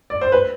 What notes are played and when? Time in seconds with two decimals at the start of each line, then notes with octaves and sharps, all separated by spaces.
0.10 D5
0.21 C5
0.32 B4